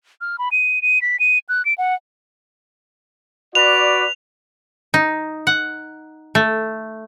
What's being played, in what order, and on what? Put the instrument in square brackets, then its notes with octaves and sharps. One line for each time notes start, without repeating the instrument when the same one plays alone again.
[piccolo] F6
B5
D#7
D#7
B6
D#7
F#6
D7
F#5
[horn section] F#4 B4 D5 [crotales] F7
[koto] D#4
F#5
A3